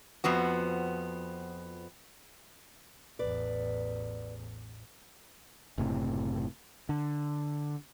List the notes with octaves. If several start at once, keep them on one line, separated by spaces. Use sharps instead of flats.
F2 F3 B3 F#4
A1 E2 B4 D5
F#1 A2 C3
D3